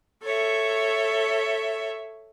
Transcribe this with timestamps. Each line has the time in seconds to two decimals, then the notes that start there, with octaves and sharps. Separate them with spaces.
0.23 A4 C#5 E5